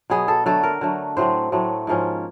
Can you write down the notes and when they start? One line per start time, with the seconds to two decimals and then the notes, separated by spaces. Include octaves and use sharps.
0.10 B2 F#3 B3 G#4
0.28 A4
0.46 D3 F#3 A3 A4
0.63 A#4
0.81 D3 F#3 A3
1.17 A2 F#3 A3 C4 C5
1.52 A2 F#3 A3 C4
1.87 G#2 F3 A#3 C#4